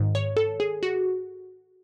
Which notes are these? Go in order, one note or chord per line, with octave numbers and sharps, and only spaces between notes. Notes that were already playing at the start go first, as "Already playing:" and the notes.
Already playing: G#2 D#3
C#5
A4
G#4
F#4